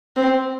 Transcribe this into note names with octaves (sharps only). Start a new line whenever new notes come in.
C4